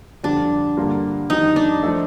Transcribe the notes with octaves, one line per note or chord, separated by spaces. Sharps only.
F2 D3 G3 D4
G2 D3 G3 A#3 F4
F2 D#3 G3 D#4
D4
F3 A3 D#4 A4